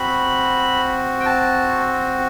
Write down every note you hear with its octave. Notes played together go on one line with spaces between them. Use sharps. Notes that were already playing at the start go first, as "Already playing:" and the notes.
Already playing: C4 F#4 B5
G5
A5